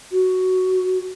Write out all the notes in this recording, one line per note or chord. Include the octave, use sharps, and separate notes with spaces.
F#4